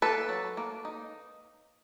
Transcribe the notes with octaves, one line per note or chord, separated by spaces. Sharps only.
A#3 A4 B4
F#3
A#3
D#4